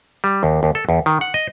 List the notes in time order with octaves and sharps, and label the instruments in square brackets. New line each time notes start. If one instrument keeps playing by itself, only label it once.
[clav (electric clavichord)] G3
D#2
D#2
A4
E2
D#3
F#5
D#5